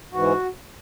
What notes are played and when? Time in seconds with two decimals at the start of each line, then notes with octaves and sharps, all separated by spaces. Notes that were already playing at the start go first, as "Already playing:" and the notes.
0.12 G#2 E3 F#4